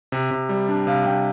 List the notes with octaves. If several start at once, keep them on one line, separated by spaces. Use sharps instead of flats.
C3
C3
G3
D4
C3 F5
C3 G5